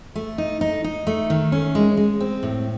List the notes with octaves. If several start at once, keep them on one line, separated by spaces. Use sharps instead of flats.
A3
D#4
D#4
D#4
A3
D#3
C#4
G#3
G#3
C4
A2